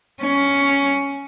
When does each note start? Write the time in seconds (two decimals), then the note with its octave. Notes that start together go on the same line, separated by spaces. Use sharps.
0.22 C#4